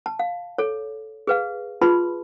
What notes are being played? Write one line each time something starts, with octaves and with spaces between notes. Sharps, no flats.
A5
F5
A4 C#5
G#4 B4 F5
F4 G#4 B4 A5 B5 C6